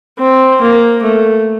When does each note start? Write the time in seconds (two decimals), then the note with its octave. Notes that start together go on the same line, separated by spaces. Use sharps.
0.18 C4
0.62 A#3
1.03 A3